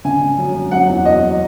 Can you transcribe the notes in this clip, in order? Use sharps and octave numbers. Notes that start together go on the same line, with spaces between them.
D3 G#5
D3
F#2
F#2
F#3 F#5
E2
B2 D#5
F#3